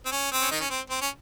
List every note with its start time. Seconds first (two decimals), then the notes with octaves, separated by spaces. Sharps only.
0.06 C4
0.12 C#4
0.32 C4
0.41 C#4
0.51 D#3 D#4
0.61 C#4
0.70 C4
0.90 C4
1.02 C#4